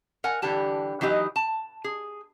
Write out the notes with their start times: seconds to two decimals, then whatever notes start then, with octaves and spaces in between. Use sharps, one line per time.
0.24 A#4 F#5 G#5
0.42 D3 E3 G3 G4 A5
1.01 E3 F#3 D#4 G4 D#5
1.36 A5
1.84 G#4